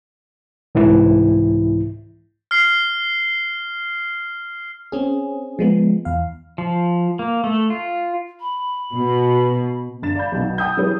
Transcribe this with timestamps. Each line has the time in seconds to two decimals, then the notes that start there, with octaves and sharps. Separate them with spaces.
0.75 C2 G#2 E3 E4
2.51 F6 C7
4.92 C4 C#4 G#4
5.59 F3 G#3 B3
6.05 E2 F5
6.58 F3
7.19 A#3
7.44 A3
7.70 F4
8.40 B5
8.93 B2
10.02 G1 D4 A6 E7
10.15 D5 F5 B5 G6
10.32 B1 B2 D#3
10.58 F#5 G5 D#6 E6 G6
10.77 E3 F#3 G4 G#4 B4 C#5